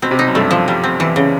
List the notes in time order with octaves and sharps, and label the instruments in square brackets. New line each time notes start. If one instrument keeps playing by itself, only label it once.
[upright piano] B2 [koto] C4
[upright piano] C3
[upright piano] B2 [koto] D#4
[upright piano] F#2
[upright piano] G2 [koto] A3
[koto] F3
G3
C4
E3
C#3